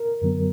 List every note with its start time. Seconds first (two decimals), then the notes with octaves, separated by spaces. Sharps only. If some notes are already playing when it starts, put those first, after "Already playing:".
Already playing: A#4
0.22 F#2 D3 F#3 B3